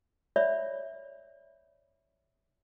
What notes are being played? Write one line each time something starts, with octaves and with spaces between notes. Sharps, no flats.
C#5 D5 E5 B5